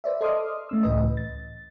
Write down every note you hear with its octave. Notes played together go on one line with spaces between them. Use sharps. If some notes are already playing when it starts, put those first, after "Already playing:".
B4 C5 D5 E5
A4 D#5 C6 D6 D#6 F6
A3 C#4 E6
C#2 A2 E3 B4 D#5
A6